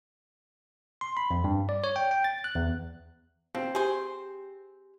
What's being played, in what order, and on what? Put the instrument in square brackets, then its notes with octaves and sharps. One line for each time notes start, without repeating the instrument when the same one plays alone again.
[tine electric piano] C6
B5
F2
G2
D5
C#5
G5
G5
A6
F#6
E2
[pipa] F3 [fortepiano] C4
[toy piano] G4 [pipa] G#4 C5